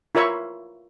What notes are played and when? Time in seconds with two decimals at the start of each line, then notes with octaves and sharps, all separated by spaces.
0.15 E4 F4 A#4 C#5 E5 C#6